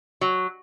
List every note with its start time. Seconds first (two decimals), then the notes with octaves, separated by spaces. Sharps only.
0.21 F#3